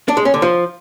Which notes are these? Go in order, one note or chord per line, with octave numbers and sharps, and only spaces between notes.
D4
G#3
C#4
D3
F3